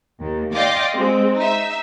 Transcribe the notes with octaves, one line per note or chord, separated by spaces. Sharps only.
D#2
D5 D#5 F5 G5 C6 D6
G#3 C4
D#4 E5